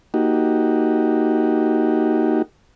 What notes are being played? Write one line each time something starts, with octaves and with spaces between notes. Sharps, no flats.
A#3 D#4 F#4 G4